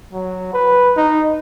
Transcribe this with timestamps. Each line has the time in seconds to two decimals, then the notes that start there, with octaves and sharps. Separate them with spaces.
0.13 F#3
0.54 B4
0.97 D#4